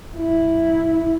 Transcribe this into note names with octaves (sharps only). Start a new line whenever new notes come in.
F#2 E4